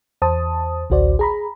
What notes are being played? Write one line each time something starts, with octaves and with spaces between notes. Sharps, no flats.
E2 C5 A5 D#6
A1 D2 F#4 C5 D5
G#4 A#5 B5